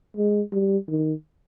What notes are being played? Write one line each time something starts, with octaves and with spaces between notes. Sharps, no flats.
G#3
G3
D#3